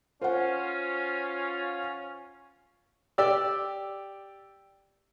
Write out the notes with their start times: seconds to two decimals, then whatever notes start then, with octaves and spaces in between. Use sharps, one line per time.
0.21 C#4 F4 C5 F#5
3.18 G4 D5 E6